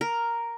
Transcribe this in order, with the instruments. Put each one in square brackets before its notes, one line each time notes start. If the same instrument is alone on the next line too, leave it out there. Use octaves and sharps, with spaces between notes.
[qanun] A#4